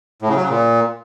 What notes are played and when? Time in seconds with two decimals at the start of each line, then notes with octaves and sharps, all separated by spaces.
0.22 A2
0.29 C#3
0.36 F#3
0.43 C#3
0.50 A#2